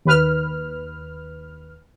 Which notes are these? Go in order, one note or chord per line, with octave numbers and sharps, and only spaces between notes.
D#2 B4 F6